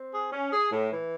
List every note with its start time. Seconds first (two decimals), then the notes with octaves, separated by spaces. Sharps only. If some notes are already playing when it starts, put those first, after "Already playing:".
Already playing: C4
0.13 G#4
0.32 C#4
0.51 G#4
0.71 A2
0.90 E3